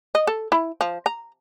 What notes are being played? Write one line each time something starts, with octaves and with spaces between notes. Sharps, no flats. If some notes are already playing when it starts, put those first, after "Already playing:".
D#5
A4
E4
F3
A#5